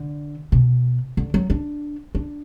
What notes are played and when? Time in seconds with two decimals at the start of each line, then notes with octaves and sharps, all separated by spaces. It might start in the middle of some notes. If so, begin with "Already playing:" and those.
Already playing: D3
0.52 B2
1.17 D3
1.34 F#3
1.50 D4
2.15 D4